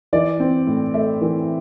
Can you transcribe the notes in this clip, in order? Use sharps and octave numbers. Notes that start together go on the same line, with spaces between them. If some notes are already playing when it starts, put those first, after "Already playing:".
E3 D5
C4
A2
A3 E5
E3